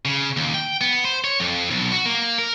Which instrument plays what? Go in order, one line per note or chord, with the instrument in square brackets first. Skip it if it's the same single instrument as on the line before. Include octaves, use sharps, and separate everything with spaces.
[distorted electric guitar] C#3
D#2
G5
B3
C5
C#5
F2
B1
F#4
A#3
A#4